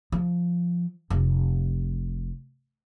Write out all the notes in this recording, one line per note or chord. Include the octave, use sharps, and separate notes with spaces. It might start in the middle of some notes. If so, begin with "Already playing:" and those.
F3
F1